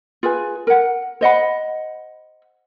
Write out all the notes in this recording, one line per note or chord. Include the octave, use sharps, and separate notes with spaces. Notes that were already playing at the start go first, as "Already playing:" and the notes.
F4 G#4 B4 G#5
A#4 F#5
C5 D#5 F#5 B5